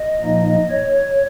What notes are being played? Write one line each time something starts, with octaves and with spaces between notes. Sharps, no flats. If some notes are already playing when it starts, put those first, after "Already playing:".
Already playing: D#5
A#2 F3 A#3 D#4
C#5